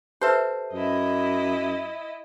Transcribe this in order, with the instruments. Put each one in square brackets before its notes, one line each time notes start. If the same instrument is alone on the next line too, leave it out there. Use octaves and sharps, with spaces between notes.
[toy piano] G4 B4 E5 [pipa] A4 C5
[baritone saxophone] F#2 [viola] E4 D#5